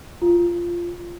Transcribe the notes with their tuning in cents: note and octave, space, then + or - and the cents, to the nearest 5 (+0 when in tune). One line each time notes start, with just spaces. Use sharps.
F4 -10